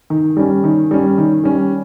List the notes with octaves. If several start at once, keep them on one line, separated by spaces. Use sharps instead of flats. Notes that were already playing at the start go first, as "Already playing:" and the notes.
D#3
G3 C#4
D#3
G3 C#4
D#3
G3 C#4